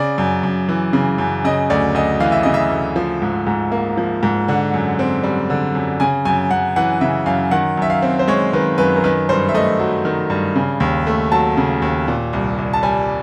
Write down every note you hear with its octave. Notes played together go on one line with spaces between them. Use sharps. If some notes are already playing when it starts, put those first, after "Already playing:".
Already playing: C#3 D5
F#2
F#2
E3
C#3
F#2
C#3 D#5
D2 D5
D2 D#5
E3 F5
E5
C#3 D#5
E5
D2
F3
G#2
G#2
A#3
F3
G#2
D3 F#5
F#2
C4
G3
D3
F#2
C#3 G#5
F#2 G#5
F#2 F#5
E3 F#5
C#3 E5
F#2 F5
D#3 F#5
F#2 E5
F5
C4
C5
G#3 C#5
D#3 B4
F#2 B4
A#4
D#3 B4
G2 C5
E5
A3 D#5
F#3
D#3
G2
C#3
D#2
A3
F#3 A5
C#3
D#2
A#2
C2
C2
A5
G3 G#5